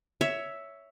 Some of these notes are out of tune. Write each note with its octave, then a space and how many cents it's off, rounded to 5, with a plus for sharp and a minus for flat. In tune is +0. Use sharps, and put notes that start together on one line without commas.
C#5 +10 E5 +0